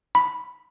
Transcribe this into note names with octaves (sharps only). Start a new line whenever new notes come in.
B5